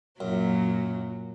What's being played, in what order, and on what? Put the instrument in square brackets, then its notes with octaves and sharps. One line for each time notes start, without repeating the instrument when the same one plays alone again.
[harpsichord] F#2 [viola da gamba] A#2 F#3 F#4